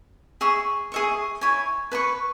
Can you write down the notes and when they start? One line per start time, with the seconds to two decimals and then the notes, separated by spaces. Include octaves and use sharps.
0.41 G#4 E5 C#6
0.92 G#4 E5 C#6
1.41 E4 C#5 G#5
1.92 B4 G#5 C#6